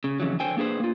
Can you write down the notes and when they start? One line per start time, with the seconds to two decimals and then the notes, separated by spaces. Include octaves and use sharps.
0.04 C#3
0.20 F2 C#3 E3 F#3
0.40 D3 C5 G5 G#5
0.57 A#3 D4 G#4 B4 C5
0.80 A#3 F4